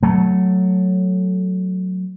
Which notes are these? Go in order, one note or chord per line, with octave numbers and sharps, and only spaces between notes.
F#3 A3